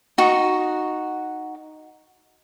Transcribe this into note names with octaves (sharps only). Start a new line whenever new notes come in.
D#4 F#4